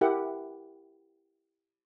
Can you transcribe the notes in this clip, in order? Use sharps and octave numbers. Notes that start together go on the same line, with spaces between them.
E4 G4 A#4 E5 F#5